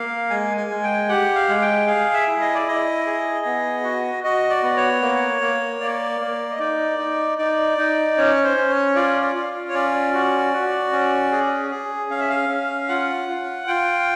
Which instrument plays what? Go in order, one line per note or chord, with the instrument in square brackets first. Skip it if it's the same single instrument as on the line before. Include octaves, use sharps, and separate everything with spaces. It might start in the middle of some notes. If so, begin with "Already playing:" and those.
Already playing: [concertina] A#3 F5
G#3 G#5
G#5
G#3
G5
G4 F#5
F5
G#3
G5
G#4 F5
E5
E4
D#5
D5
E4 D#5
G#4
B3
F#4
F#4 D#5
D5
B3
C#5
A#3
A#3
A#3 D5
A#3
D#5
D#4 D5
D#4
D#4 D5
D#4
C#4 C#5
C5
C#4
C#5
F4 D5
D5
F4
C#5
C#4 D5
F#4
F#4
C#4
G#4
G#4
C#4 F5
E5
F5
C#4
F4 F#5
F4
F4 G5